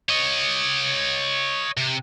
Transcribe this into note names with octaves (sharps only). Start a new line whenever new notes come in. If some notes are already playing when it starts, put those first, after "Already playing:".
C#5 D#5
C3